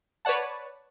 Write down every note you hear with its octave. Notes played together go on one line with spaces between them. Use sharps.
B4 C#5 D5 F#5 A5